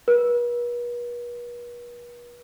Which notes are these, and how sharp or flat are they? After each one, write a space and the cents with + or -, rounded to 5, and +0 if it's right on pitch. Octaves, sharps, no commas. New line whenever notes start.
B4 -45